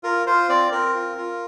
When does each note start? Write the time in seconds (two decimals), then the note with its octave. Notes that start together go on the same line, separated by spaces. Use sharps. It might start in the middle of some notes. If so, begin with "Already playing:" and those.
0.03 F4 A#4
0.27 F4 C5
0.49 C4 D5
0.72 C4 A#4
0.94 F4
1.18 F4